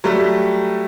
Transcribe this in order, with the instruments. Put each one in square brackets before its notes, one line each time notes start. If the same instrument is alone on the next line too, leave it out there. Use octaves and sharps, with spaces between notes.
[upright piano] F#3 G3 A3 G4